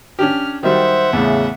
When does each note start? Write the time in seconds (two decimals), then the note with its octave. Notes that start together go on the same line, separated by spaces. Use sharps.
0.19 C#4 D4 G4 F6
0.63 D#3 F#3 G3 C5 E5 F#5
1.13 E2 A2 C#3